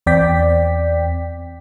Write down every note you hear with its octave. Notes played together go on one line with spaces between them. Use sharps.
E2 C4 D5 G5 B6